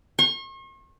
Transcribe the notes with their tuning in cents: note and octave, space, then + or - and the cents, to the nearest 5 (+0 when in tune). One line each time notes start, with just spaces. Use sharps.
C#6 -45